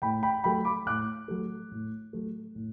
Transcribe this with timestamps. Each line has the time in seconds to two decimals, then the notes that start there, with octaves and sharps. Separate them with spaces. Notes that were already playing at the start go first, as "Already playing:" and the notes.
0.02 A2 G5 B5
0.23 G5 B5
0.44 F#3 A3 G5 B5
0.65 B5 D6
0.86 A2 D6 F#6
1.28 F#3 A3
1.71 A2
2.13 F#3 A3
2.55 A2